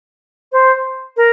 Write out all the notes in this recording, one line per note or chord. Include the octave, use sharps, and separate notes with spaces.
C5
A#4